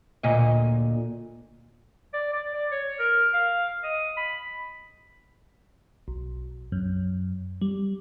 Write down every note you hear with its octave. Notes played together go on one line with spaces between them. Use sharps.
D2 A#2 D#5
D5
D5
D5
C#5
A#4
F5
D#5
B5
B1
F#2
G3